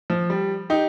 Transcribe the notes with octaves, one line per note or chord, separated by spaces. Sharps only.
F3
G3
D#4 G4